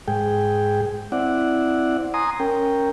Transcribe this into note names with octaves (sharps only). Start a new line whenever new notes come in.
G#2 G#4 G5
C4 E4 D5 F#5
G#5 A#5 C6 D#6
C#4 A#4 G5